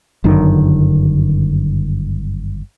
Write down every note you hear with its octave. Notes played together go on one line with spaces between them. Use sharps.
G1 F#2 D3 D#3